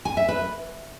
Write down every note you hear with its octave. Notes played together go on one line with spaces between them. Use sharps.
G#5
E5
B4